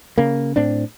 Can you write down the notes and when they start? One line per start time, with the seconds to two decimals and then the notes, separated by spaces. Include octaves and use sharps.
0.18 C#3 A#3
0.56 A2 C4 D4